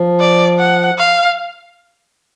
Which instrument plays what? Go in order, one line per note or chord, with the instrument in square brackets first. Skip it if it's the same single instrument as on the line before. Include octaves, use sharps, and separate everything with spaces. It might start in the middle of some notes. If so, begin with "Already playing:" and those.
Already playing: [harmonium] F3
[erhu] D5
F#5
F5